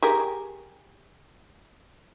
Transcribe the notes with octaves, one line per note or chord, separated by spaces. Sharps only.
G4 G#4 A#4